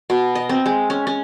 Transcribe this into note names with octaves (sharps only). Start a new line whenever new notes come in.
B2
D#5
C4
G#3
C#4
C#4